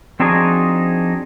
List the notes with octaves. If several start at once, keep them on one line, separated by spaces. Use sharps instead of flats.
F3 C4 D4 D#4 F#4 G#4